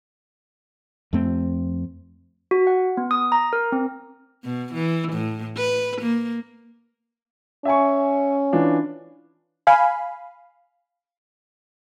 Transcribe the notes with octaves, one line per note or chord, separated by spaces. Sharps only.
F2 A3 C4
F#4
F#5
B3
D#6
A#5
A#4
C4
B2
E3
A2
B4
A#3
C#4 E5 G#5 C#6
E3 D4 F4
F5 G#5 B5